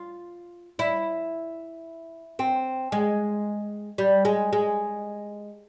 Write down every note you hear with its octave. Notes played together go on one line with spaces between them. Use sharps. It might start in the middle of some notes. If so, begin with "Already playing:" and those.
Already playing: F4
E4
C4
G#3
G3
G#3
G#3